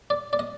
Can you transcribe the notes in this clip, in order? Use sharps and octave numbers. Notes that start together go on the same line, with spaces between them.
D5
D5
D#5